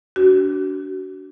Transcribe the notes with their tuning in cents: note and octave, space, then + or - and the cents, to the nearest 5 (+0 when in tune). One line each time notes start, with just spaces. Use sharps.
D4 -25 F#4 +25